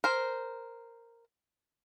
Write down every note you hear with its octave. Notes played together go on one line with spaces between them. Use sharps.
A#4 C5